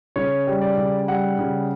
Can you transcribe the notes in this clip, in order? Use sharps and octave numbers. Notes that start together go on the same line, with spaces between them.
C#3 C#5
G3
D5
C#3
G3 F#5
C#3